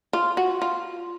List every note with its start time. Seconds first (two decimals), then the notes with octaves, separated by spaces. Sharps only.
0.13 F4
0.37 F#4
0.62 F4